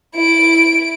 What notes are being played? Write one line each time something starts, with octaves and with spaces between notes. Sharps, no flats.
E4 D7